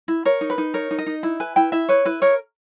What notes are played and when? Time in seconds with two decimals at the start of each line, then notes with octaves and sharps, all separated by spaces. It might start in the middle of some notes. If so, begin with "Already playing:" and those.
0.08 E4
0.25 A#4 C#5
0.41 D#4
0.50 B4
0.58 D#4
0.74 A#4 C#5
0.91 D#4
0.98 D#5
1.06 D#4
1.23 E4
1.40 B4 G#5
1.56 E4 G5
1.72 E4 E5
1.89 B4 C#5
2.05 E4 B4
2.22 A#4 C#5